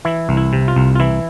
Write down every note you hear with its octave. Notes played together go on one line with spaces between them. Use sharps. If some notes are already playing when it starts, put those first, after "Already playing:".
E3 E4
C2
E4
C3
F4
C2
F4
E3 E4